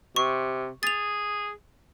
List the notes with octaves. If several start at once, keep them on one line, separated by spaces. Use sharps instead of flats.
C3 C#6
G#4 A6 F7